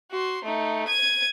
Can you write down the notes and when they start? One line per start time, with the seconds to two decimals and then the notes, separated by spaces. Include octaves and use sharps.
0.11 F#4 C6
0.45 A3 D#4
0.88 G#6 D#7